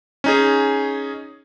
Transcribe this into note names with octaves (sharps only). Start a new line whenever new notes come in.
C#4 D#4 G#4